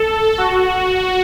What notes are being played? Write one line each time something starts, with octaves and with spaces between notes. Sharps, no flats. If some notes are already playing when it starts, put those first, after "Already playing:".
Already playing: A4
F#4
F#4